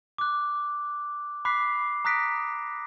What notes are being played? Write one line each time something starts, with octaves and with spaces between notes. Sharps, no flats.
D6 F#6
B5 D6 F#6 B6 C7
A#5 D#6 F#6 A#6 B6 D7